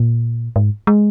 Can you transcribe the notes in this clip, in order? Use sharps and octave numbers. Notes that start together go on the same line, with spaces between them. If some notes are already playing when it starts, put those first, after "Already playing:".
Already playing: A#2
G#2
G#3